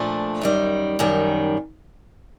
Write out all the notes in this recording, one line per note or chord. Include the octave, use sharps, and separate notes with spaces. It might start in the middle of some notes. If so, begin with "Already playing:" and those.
Already playing: A#2 F3 A3 D4
F#2 D#3 G3
F#2 D#3 G3